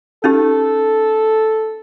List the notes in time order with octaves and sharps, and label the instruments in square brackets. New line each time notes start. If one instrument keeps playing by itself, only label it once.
[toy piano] C#4 D#4 G4 [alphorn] A4